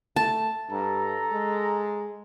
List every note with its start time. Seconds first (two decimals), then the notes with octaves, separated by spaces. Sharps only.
0.16 A3 A5
0.71 G2 A4 A#5
1.33 G#3